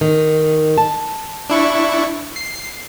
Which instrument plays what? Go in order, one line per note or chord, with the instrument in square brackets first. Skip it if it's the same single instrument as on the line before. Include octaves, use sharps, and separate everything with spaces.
[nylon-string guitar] D#3
A5
[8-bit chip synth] D4 E4 C#6
C7